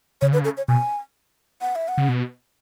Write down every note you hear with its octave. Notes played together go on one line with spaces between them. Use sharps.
C#3 C#5
D3 B4
C#3
A4
C#5
B2 G#5
F#5
E5
F#5
C#3
B2